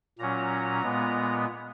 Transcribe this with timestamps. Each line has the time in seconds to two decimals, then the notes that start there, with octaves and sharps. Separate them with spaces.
0.19 A#2 F#3 C#4 A#5
0.82 A#2 G#3 B3